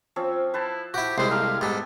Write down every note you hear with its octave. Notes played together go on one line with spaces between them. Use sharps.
F3 C4 C#4
E4 B4 C5 A5
E4 F#4 G4
C2 G#3 E4 B4 C5 G5
A3 A#3 G4 F5
G#2 G3 B3 G4 A4